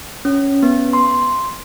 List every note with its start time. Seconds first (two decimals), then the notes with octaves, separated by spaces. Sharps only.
0.25 C#4
0.63 B3
0.93 C6